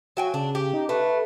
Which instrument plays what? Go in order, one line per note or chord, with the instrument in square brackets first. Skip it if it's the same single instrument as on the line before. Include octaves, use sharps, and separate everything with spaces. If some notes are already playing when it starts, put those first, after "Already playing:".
[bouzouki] F#3 G5 G#5 [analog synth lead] F#4
[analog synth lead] C#3 [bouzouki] D4
[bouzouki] G4
[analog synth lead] D#4
[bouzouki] A3 [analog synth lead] B4